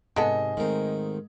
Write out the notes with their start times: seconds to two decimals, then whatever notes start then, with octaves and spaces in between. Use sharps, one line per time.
0.16 G#2 C3 G#3 B3 A4 D#5 G#5
0.57 G#2 D#3 A3 C4 A#4